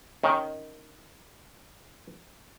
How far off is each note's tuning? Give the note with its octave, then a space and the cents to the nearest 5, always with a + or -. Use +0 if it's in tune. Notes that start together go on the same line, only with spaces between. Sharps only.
D#3 +0 C#4 -5